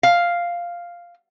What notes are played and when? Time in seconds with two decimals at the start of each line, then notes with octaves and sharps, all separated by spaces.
0.03 F5